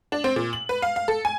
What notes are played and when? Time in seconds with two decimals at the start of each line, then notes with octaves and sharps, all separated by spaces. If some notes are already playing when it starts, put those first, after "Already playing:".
0.12 D4
0.24 C4
0.36 A#2
0.53 F#7
0.69 B4
0.82 F5
0.96 F5
1.08 A4
1.25 G#5